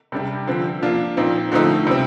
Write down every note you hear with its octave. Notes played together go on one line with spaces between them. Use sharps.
C3 G3 D4 G4
D3 F3 C4
F3 A#3 D4 F4
A#2 F3 C4 D#4
D3 F3 A3 C4 D#4
C3 G3 C4